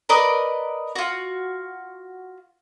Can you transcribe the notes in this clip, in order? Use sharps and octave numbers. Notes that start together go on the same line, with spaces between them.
A#4 B4 D5 D#5
F4 F#4